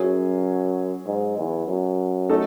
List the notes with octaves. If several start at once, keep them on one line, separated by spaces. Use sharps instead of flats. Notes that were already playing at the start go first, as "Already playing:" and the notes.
Already playing: F#2 F#3 C#4 G#4
G#2
E2
F#2
A3 D#4 A4